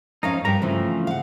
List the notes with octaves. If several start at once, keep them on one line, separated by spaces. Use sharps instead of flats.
F2 C#4 D#4 A#4 F5
G2 G4 A#4 A#5
C#3 E3 F3 A3 C4
F5 F#5